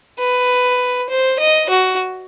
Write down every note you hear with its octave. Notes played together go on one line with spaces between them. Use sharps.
B4
C5
D#5
F#4